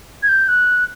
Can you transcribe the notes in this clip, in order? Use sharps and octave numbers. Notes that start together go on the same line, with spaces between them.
G#6
G6
F#6